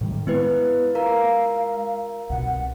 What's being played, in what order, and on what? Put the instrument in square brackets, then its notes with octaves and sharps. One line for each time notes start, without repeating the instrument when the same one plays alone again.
[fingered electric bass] A2 D#3 G3
[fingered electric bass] G#3 [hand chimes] B3 E4 B4
[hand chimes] F4 A#4 A#5 [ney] F5
[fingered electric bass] C2 B2 [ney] F#5